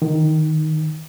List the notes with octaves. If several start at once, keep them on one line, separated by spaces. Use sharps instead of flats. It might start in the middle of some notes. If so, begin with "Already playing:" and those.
D#3